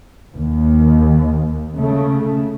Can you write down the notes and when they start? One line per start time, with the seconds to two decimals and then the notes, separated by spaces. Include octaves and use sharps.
0.34 D#2
1.75 C#3 A3